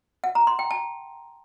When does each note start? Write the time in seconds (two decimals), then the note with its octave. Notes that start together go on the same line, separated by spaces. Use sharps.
0.24 F#5
0.35 A#5
0.47 C6
0.59 G5
0.71 A5